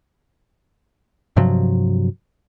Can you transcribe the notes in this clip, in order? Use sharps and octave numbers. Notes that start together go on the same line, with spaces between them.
G2 C3 F3 F#3